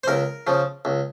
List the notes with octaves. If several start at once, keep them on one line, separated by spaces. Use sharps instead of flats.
C5
C#2 A#4
C#3 F3
C#2